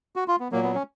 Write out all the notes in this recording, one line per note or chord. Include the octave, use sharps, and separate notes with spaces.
F#4
F4
B3
A#2 F#3 A#3
B3
C#4